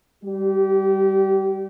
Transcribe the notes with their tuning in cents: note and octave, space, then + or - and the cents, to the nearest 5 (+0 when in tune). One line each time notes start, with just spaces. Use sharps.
G3 +0 G4 -30